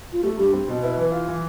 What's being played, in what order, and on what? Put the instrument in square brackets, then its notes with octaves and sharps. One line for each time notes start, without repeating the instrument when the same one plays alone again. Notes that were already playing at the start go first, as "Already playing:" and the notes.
[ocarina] F4
[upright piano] A3 [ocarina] G4
[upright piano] G2 [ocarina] G4
[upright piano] C4
B2
[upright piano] E4 [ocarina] B4
[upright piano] E3
F4
E3